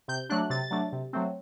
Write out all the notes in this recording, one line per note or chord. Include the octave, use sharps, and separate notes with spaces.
C3 G6
F#3 A3 D4 F#6
C3 A6
F#3 A3 D4
C3
F#3 A3 C4